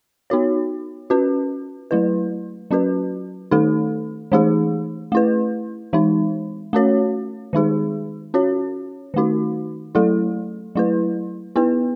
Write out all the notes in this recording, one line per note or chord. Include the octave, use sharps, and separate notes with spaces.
B3 D#4 F#4 C#5
C#4 F#4 B4
F#3 A3 E4 B4
F#3 C#4 F#4 B4
D#3 A3 D#4 A4
E3 A3 D#4 G#4
A3 E4 B4
E3 G#3 D#4
A3 C#4 F#4 C#5
D#3 G#3 D#4 G#4
C#4 F#4 C#5
D#3 A3 D#4 F#4
F#3 A3 E4 A4
F#3 A3 E4 B4
B3 E4 B4